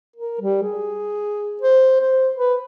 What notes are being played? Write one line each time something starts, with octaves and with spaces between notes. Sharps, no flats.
A#4
G3
G#4
C5
C5
B4